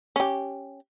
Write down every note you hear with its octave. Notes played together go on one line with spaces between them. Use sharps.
C#4 G4